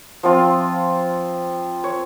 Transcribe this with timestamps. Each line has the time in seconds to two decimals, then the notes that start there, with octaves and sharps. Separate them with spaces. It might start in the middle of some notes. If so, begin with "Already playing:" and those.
0.23 F3 C4 F4
1.84 C#5